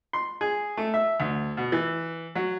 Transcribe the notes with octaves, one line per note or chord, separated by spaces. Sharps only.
C6
G#4
A3
E5
D2
B2
E3
F#3